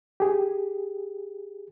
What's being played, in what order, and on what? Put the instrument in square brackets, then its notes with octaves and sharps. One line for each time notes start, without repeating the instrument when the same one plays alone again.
[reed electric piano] G4 G#4